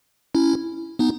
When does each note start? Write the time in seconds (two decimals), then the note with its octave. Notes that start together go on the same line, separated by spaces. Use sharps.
0.35 C#4 E4
0.99 B3 D#4